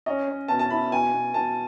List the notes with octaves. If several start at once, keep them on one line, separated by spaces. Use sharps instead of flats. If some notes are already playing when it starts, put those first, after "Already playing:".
C#4 D#5
C#4
B2 A5
A5
E4 B5
B2 G#5
B2
B2 A5